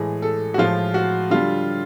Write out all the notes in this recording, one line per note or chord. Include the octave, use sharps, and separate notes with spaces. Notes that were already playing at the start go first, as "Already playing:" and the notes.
Already playing: A2 E3 G#3 G#4
A4
F#4
A2 F3 G#3 F4
F#4
D3 G3 F4